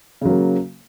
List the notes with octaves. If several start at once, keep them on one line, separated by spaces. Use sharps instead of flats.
C#3 F#3 A#3